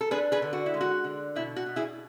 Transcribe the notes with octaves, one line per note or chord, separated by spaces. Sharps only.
A4
D4 G#4 B4
G#4 B4
D3
F#4
E4
G#3
F#4
D3
B2 E4
F#4
B2
E4 G#4